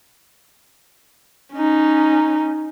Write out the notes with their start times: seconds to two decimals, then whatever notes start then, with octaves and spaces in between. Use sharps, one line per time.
1.54 C#4 D#4